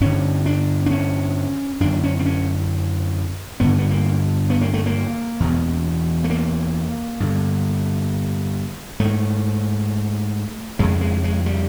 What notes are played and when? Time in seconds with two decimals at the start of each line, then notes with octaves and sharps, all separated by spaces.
0.01 G2 D3 C#4
0.46 D4
0.86 D4
0.91 C#4
1.80 F#2 D3 D4
2.04 C#4
2.19 C4
2.26 C#4
3.60 G2 D3 B3
3.78 B3
3.90 A#3
4.50 B3
4.62 A#3
4.74 A3
4.86 A#3
5.40 E2 B2
6.24 A3
6.30 A#3
7.20 G2 D3
9.00 G#2 A3
10.79 F2 C#3 G#3
11.01 G#3
11.24 G#3
11.46 G3